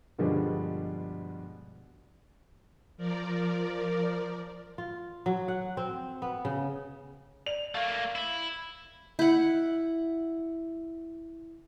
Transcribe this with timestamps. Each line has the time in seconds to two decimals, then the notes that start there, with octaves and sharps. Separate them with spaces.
0.18 G2 B2 D3 F3 G3 G#3
2.97 F3 A#4 D5
4.78 F4
5.26 F#3
5.48 F#5
5.77 C4
6.22 B3
6.45 C#3
7.46 D5 F7
7.75 A3 A#3 F5
8.15 E4
9.19 E4 F#5